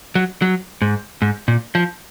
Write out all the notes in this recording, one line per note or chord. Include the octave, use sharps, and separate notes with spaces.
F#3
F#3
G#2
G#2
A#2
F3